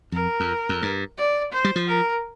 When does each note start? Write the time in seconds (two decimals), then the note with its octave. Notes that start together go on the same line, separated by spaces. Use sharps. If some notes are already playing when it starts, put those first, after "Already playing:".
0.12 F2 A#4
0.40 F2
0.69 F2
0.82 G2
1.18 D5
1.52 C5
1.64 G3
1.76 F3
1.87 A#4